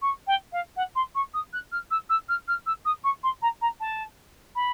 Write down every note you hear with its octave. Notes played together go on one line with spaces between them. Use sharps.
C#6
G5
F5
F#5
C6
C#6
D#6
F#6
F6
E6
E6
F6
F6
E6
D#6
C#6
C6
A#5
A#5
A5
B5